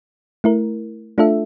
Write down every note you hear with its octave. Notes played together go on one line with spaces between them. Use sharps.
A3 E4 A#4
A3 D4 F4 A4 E5